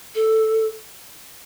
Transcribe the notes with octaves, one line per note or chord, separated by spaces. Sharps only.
A4